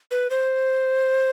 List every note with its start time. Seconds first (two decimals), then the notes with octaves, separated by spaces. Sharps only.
0.11 B4
0.30 C5